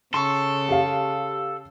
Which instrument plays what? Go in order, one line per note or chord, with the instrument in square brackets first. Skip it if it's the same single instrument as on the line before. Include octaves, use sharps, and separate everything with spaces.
[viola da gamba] C#3 [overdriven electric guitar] A4 [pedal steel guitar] C6 C#6
[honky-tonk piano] G4 F5